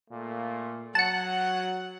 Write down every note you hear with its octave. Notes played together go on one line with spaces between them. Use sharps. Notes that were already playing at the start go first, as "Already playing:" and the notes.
A#2 A3 A#3
F#3 F#5 A5 C#7